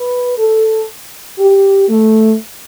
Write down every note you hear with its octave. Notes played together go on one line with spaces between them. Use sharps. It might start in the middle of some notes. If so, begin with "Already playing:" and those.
Already playing: B4
A4
G4
A3